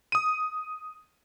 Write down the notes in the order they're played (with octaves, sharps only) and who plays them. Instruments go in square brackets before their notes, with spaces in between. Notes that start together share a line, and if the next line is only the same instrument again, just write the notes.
[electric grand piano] D#6 D#7